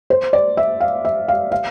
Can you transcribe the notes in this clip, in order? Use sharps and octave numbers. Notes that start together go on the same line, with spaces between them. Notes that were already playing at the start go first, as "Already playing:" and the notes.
C5
D5
E5
F5
E5
F5
F5